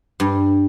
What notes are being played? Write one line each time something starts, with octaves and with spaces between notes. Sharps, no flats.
G2